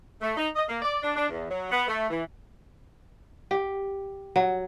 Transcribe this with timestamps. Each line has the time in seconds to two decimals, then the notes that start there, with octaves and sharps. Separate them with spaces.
0.22 A3
0.37 D#4
0.56 D#5
0.69 A#3
0.82 D5
1.03 D4
1.16 D4
1.29 E2
1.50 F#3
1.72 B3
1.88 A3
2.10 E3
3.51 G4
4.36 F#3